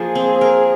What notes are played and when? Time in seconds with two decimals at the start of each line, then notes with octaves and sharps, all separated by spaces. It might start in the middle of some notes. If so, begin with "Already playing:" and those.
Already playing: F3 A#3 G#4
0.15 C4
0.41 A#4